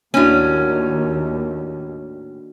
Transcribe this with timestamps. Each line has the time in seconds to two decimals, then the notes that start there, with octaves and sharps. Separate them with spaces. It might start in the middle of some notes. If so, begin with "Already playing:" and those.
0.14 D#2 A2 A#3 C#4 D4 F#4